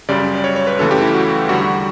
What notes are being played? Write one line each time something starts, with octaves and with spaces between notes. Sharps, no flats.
F#2 C#3 G3 D5
D5
C#5
C#5
B4
F#2 C#3 E3 A3 A4
G4
E4
F#4
E2 D3 G3 F#4